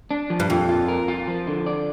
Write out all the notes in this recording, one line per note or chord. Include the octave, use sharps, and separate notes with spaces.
D4
F3
G2
F2 A#2
F4
A#4
F4
F3
D3
D5